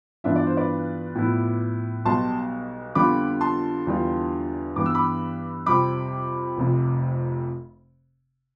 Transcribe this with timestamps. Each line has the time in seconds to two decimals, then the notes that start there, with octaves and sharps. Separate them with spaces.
0.24 G2 E3 B3 D4 F4 E5
0.36 D5
0.47 C5
0.57 B4 D5
1.15 A2 F3 B3 E4
2.05 B1 B2 G3 A5 C6
2.95 F2 D3 G3 B3 F4 B5 D6
3.41 A5 C6
3.86 E2 D3 G3 D4 F4
4.76 G2 E3 G3 B3 D6
4.86 E6
4.95 B5 D6
5.66 F2 C3 G3 C4 B5 D6
6.57 F1 F2 C3